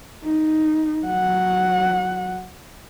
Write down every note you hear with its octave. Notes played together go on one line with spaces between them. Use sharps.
D#4
F#3 F#5